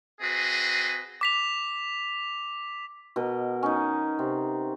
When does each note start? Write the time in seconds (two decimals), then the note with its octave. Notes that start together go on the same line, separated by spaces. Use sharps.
0.21 C4 F#4 G#4 B4 D#5
1.21 D6 B6 F7
3.16 B2 A#4 D#5
3.63 C#4 D#4
4.19 C3